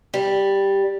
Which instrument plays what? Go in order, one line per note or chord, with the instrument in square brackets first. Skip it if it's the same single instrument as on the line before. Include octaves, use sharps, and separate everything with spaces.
[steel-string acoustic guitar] G3